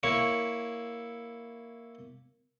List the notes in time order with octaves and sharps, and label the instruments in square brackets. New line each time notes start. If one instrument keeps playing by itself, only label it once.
[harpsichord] A#3 E4 C#5 C#6